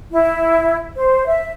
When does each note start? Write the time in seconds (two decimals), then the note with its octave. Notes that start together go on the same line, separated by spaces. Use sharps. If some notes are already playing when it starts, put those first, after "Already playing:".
0.12 E4
0.96 C5
1.27 E5